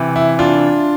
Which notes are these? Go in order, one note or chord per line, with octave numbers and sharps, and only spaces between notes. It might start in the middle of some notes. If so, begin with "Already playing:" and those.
Already playing: C3 E3
E4
D4 F4